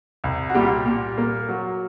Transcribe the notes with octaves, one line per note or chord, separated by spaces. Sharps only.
C2
F#4
A#2 G3 G4
A#2
A#3
F#3